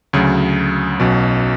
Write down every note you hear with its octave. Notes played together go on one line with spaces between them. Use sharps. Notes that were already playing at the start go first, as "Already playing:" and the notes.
D2 C#3 F#3
B1 B2 F#3 C#4